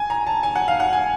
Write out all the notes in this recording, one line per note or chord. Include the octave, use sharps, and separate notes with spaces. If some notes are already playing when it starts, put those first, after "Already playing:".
Already playing: G#5
A#5
A5
G#5
F#5
F5
F#5
G#5